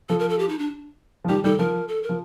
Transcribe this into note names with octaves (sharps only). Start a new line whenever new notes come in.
F3 A4
A#4
A4
G4
D#4
D4
F3
D#3 G3 G4
D#3 G3 A4
F3 A#4
A4
A#4
F3